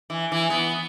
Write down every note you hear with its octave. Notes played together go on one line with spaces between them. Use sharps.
E3
E3
B3